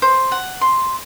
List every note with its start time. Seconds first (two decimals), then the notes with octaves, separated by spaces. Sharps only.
0.02 C5
0.32 F#5
0.61 C6